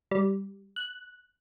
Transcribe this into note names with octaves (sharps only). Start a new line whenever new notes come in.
G3
F#6